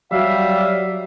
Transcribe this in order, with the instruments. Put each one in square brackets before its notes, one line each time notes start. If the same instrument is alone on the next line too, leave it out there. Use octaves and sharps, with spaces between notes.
[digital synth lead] F#3 [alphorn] G3 [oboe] E5 [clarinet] F5